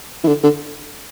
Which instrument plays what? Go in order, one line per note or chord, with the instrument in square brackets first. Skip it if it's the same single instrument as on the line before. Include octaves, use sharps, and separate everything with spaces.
[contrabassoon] E3
D3
D3